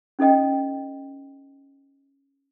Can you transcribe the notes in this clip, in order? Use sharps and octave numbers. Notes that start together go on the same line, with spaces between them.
C#4 D#4 A4 D#5 G5